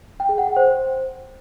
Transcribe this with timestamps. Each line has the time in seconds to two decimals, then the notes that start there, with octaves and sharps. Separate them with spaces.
0.20 G5
0.29 G#4
0.38 F#5
0.47 G5
0.56 C5